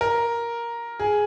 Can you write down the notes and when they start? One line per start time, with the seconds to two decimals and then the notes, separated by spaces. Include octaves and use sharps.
0.01 A#4
1.00 G#4